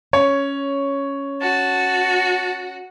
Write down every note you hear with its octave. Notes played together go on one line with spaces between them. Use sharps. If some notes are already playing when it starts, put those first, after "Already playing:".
C#4 C#5
F#4 A5